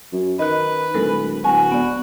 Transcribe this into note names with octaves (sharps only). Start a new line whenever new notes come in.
F#2
D#3 B4 D#5 F#6
D1 G#3 A4 A#4
D1 F#4 G#5
B3 D5